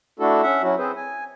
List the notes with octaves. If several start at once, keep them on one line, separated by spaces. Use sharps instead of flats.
A3 D4 E4 F#4 A4
C#4 E5 F#5
F#3 C#4 E4 F#4
C4 G#4 B4 C5
G#5